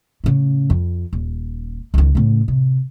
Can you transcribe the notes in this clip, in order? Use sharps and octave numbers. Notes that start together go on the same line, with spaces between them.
A2 C#3
F2
D#1
C#2 D#3
A2 C#3
C3